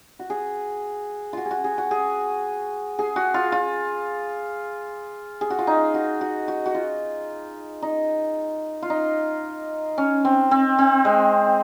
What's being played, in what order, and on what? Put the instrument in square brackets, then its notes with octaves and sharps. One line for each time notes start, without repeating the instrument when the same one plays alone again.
[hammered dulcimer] F#4
G#4
F4 F#4
G#4
F#4
G#4
F#4
G#4
G#4
F#4
F4
F4
G#4
F#4
F4
D#4
F#4
F#4
F#4
F#4
F4
D#4
F4
D#4
C#4
C4
C4
C4
G#3